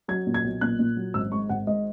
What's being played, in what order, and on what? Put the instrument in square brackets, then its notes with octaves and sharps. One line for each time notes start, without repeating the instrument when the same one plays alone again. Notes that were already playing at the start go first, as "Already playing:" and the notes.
[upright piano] F#3 G#6
A#2
G#6
B1
A#2 F#6
A#2
F#3
G#1 E6
G#2 C#6
G#1 F#5
G#2 D#5